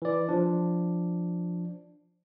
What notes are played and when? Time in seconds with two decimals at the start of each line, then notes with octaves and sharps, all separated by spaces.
0.02 E3 D5
0.29 F3 D4